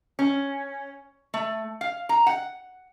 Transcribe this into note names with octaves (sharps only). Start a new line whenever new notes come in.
C#4
A3
F5
A#5
F#5